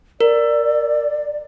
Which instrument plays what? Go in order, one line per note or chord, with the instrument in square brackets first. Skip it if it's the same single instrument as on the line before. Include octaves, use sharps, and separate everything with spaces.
[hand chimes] A#4 [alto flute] D5